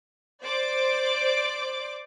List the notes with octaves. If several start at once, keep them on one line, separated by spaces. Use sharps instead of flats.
C5 D5 D6